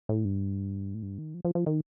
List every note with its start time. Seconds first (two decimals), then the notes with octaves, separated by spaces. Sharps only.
0.09 A2
0.25 G2
0.94 A2
1.03 G2
1.18 D#3
1.34 F3
1.45 F3
1.55 F3
1.66 D#3